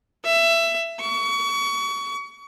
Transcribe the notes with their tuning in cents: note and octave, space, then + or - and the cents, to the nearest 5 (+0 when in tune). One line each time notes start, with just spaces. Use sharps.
E5 +20
C#6 +30